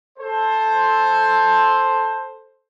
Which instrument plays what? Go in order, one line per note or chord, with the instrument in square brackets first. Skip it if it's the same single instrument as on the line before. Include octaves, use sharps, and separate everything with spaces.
[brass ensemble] A4 C5